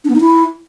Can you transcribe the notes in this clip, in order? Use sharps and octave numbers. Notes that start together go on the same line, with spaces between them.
D4
B3
D#4
E4